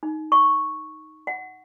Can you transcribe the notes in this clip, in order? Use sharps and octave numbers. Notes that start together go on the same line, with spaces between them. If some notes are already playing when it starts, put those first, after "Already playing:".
D#4
C#6
F#5